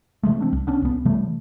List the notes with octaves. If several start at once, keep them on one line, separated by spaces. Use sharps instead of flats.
C3 E3 G#3 A3
C4 D4
C2
B3 C#4 D4
C2 B3
C3 E3 G3 A3